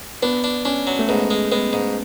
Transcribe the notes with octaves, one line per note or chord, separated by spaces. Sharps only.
B3 D4
D4
C#4 D4
F#3
A3
G#2 B3
G#3
G#3 B3
G#2